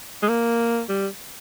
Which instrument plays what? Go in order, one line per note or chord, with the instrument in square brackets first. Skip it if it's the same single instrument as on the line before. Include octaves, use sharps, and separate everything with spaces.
[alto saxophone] G#3
A#3
G3